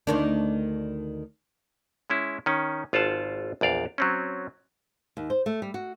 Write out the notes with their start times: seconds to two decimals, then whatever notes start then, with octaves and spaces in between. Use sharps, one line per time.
0.07 D2 D#3 D4
2.10 G#3 C#4 E4
2.46 D#3 C#4
2.93 G#1 F4 C5 F#5 A5
3.61 A#1 E2 D5 F5
3.98 F#3 C4 C#4
5.17 D#2
5.30 C5
5.46 A3
5.62 G3
5.74 F#4